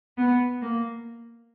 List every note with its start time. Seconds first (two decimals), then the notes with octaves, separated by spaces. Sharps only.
0.18 B3
0.62 A#3